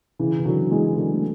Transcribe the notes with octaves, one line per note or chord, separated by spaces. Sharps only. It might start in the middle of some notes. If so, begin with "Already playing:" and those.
C#3 E3
E3
D3 F#3
E3 G#3
D3 F#3
A3